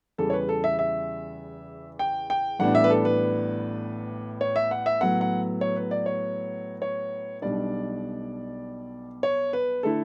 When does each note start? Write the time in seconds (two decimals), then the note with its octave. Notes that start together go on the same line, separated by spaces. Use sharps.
0.18 E2 C#3 G3 A4
0.30 C#5
0.33 B4
0.49 A4
0.64 E5
0.79 E5
1.99 G5
2.30 G5
2.59 A1 A2 G3 B3 D4 F#5
2.75 E5
2.84 B4
2.90 A4
3.05 B4
4.41 C#5
4.56 E5
4.71 F#5
4.86 E5
5.01 A2 F#3 B3 F#5
5.21 F#5
5.61 C#5
5.76 B4
5.91 D5
6.06 C#5
6.82 C#5
7.42 B1 B2 G3 D4 D5
9.23 C#5
9.53 B4
9.83 D3 A3 E4 A4